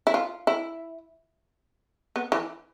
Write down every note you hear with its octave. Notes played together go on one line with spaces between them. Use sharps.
E4
F4
E4
B3
E3